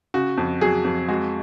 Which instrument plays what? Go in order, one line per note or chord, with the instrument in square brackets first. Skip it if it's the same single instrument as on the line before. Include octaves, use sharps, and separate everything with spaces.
[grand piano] C#3 F#4
F2
F#3 G#4
F2
G#3 F#4